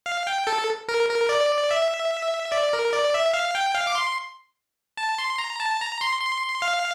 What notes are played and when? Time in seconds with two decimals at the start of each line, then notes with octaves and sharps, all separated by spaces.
0.06 F5
0.27 G5
0.47 A4
0.88 A#4
1.09 A#4
1.29 D5
1.71 E5
2.52 D5
2.73 A#4
2.93 D5
3.14 E5
3.34 F5
3.55 G5
3.75 F5
3.87 D6
3.95 C6
4.97 A5
5.18 C6
5.38 A#5
5.60 A5
5.80 A#5
6.01 C6
6.20 C6
6.62 F5